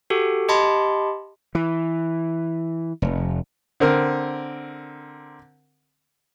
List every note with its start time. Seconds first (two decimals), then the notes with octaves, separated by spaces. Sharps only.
0.10 F#4 G4 A4
0.48 G4 D#5 A5 B5 C6
1.55 E3
3.02 F1
3.80 D3 C4 A#4